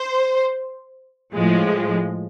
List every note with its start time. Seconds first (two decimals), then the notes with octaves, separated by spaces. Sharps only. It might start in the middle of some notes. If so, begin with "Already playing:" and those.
Already playing: C5
1.33 A2 F3 G#3